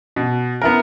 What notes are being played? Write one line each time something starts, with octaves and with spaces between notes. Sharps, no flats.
B2
B3 E4 A#4